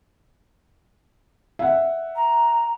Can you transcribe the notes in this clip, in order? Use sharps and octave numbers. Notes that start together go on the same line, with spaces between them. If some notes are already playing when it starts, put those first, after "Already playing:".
E5 F#5
A#5